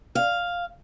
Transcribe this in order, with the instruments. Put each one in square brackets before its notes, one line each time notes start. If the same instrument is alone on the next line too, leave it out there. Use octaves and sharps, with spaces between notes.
[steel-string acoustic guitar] F5